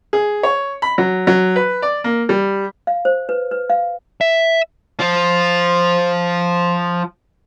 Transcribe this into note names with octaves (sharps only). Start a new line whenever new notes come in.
G#4
C#5
B5
F#3
F#3
B4
D5
A#3
G3
F5
C5
B4
B4
F5
E5
F3 F4